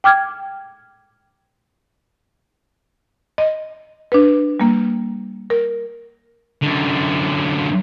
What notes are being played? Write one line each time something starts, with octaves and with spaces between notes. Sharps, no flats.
G5 D6 F6 G#6
D#5
D4 B4
G3 A#3
A#4
F#2 D3